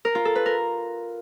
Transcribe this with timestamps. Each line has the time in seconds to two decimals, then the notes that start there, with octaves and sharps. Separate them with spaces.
0.05 A#4
0.15 F4
0.25 A4
0.35 B4
0.46 A#4